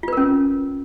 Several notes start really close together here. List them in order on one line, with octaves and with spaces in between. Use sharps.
F4 B4 A#4 C#4